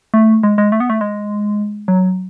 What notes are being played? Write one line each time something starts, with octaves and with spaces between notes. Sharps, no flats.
A3
G#3
G#3
A3
B3
A3
G#3
F#3